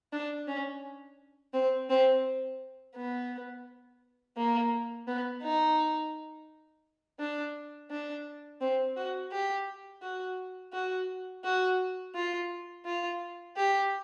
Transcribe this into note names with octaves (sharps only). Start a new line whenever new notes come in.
D4
C#4
C4
C4
B3
A#3
B3
D#4
D4
D4
C4
F#4
G4
F#4
F#4
F#4
F4
F4
G4